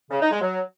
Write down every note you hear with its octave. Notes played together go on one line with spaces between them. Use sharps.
C#3
D#4
G#3
F#3